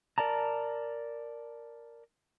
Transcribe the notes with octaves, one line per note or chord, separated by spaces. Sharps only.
A#4 D5 A5 A#5